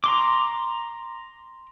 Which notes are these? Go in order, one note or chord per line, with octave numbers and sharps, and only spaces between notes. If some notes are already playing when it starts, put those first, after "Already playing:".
A#5 C6 D6